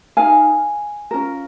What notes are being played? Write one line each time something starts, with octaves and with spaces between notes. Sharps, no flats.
D#4 A#4 F5 G#5
C#4 F4 A#4